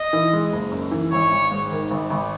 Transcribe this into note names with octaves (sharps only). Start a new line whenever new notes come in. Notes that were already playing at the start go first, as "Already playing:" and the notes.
Already playing: D#5
E3
G#3
F#1
F#2
E3
G#1 C#5
G#1
G#2
D#3
G#1
G#1